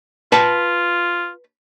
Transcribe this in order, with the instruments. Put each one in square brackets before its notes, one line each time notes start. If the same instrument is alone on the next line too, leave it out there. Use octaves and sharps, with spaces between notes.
[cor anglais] F4 [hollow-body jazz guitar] B4 G5 A5